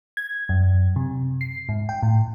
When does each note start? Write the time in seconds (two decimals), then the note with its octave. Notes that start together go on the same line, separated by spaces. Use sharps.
0.17 G#6
0.49 F#2
0.96 C3
1.41 C7
1.69 G#2
1.89 G5
2.03 A2